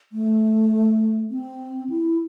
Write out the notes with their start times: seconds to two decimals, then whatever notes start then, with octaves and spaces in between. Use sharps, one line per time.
0.13 A3
1.31 C4
1.90 E4